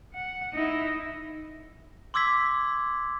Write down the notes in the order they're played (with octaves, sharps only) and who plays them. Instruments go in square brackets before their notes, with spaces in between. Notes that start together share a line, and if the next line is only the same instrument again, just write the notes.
[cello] F#5
D#4 E4
[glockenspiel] C6 D6 E6 G#6 B6